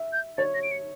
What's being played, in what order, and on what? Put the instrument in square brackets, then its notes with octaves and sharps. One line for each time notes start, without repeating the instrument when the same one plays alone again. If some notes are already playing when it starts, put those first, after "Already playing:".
Already playing: [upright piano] E5
[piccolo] G6
[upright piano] C#5 [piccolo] A6
[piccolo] A#6
D7
C#7